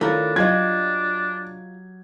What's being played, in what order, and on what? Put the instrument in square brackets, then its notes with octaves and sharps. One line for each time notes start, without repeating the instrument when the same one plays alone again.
[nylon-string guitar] D#3 F4 C#5 [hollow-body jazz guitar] A3 A#4 [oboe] D4 [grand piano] E4
[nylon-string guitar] F#3 G4 D#5 [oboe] D4 [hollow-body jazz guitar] F4 [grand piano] G#6